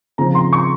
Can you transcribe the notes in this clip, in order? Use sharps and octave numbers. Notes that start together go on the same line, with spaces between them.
C#3 F3 C4 A#5
C6
C#6